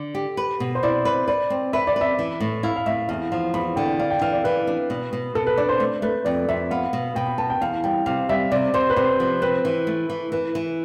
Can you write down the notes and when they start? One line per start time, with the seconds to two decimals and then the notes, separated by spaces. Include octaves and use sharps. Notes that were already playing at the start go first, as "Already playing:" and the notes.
Already playing: D3
0.15 G4
0.37 B4
0.60 B2
0.75 C5
0.83 E4 D5
1.05 B4 C5
1.28 B4 D5
1.50 C4
1.73 B4 E5
1.87 D5
1.96 B4
2.01 E5
2.19 E3
2.40 A2
2.63 E4 F5
2.76 F5
2.86 A2 E5
3.09 E2 F5
3.32 F3 F5
3.54 E2 B5
3.76 D3 G5
3.99 D4 F5
4.10 G5
4.21 E3 F5
4.33 D5
4.44 E3 B4
4.67 D4
4.90 B2
5.13 B2
5.35 B2 A4
5.47 B4
5.57 D4 D5
5.69 C5
5.80 A3
6.02 A3 B4
6.25 F2 D5
6.49 F2 E5
6.71 B3 F5
6.93 B2
7.15 B2 G5
7.27 B5
7.38 B3 A5
7.50 G5
7.61 E2 F5
7.84 G3 G5
8.06 C3 F5
8.29 G3 E5
8.52 C3 D5
8.74 C3 C5
8.90 B4
8.96 C3 C5
9.20 F3
9.42 C4 B4
9.65 E3
9.87 A3
10.10 E3
10.32 E3 B4
10.55 E3